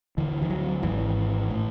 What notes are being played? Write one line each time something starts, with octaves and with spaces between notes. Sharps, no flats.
D2 D3 E3
E3
F#3
G#1 G#2 E3
A2